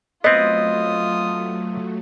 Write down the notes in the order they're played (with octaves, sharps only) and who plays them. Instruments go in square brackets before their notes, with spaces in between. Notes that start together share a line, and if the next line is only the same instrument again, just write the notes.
[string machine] F#3 A3 [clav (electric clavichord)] B3 C4 [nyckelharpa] F4 D#6 [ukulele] D#5